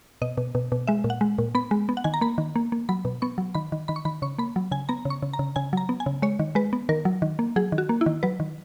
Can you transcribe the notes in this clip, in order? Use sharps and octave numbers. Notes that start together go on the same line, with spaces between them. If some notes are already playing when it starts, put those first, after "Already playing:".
B2 D#5
B2
B2
B2
G#3 E5
A#2
F#5
G#3
A#2
B3 B5
G#3
B3
F#5
D#3 G#5
A#5
A#3 B5
D#3
A#3
A#3
F#3 B5
B2
B3 C#6
F#3
D#3 B5
D#3
D#3 B5
C#6
D#3 B5
C#3 C#6
A#3 B5
F#3
C#3 G#5
B3 A#5
C#3
C#6
C#3
A#5
C#3
C#3 G#5
F#3 A#5
B3
G#5
C#3
G#3 C#5
D#3
G#3 B4
B3
D#3 A#4
F#3
D#3
A#3
F#3 G#4
D#3
F#4
A#3
E4
D#3
F#3 B4
D#3